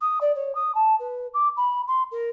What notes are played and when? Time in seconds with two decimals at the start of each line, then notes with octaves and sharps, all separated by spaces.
0.01 D#6
0.21 D5
0.35 C#5
0.55 D#6
0.75 A5
0.99 B4
1.34 D6
1.57 B5
1.87 C6
2.11 A#4